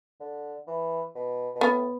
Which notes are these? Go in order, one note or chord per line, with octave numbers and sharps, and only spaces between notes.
D3
E3
B2
B2
A2 B3